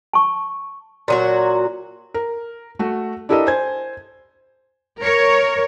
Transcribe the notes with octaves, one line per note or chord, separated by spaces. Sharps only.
A5 C#6
A#2 F#3 F#4
A#4
A3 F#4
D4 E4 G4 A4 A#4 D#5
C5 G#5 G#6
A#4 C#5